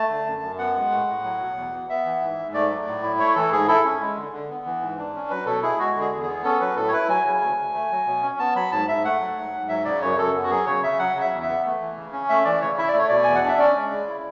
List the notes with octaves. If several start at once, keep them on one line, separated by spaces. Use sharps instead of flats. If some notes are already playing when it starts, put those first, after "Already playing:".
Already playing: A3 A5
D3
F#2
F#2
B3 F#5
G#3
A2
A2
F#3
B2
E2
B3
B3 E5
E3
G#2
G#2
A3 D5
F#3
A2
E4
A3 C#5
E3 A4
G#2 G#4
E4 A4
C#4
G#3
D3
D3
B3
E3
G#2
D4
C#4
F#3 B4
B2 A4
E4 G#4
G#3 F#4
D3
G#4
E2
B3 G#4
C#4 A4
F#3 B4
A2 A4
C#5
E4 B4
F#3 G#5
C#3
D2
D2
A3
F#3
B2
C#4
B3 A5
F#3 B5
G#2 A5
G#2 E5
A3 F#5
F#3
G#2
G#2
F#3 E5
C#3 D5
F#2 C#5
F#2 A4
B3
F#4
F#3 G#4
C#3 C#5
C#3 E5
F#3 F#5
C#3 E5
E2
E5
B3
A3
E3
C#3
C#4
A3 E5
E3 D5
C#3 C#5
E4 E5
D5
A3 C#5
B2 D5
E2 G#5
F#5
D4 E5
C#4 D5
G#3
C#3
E4